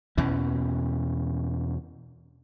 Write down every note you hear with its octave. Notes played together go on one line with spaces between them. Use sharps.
E2 B2 E3 C#4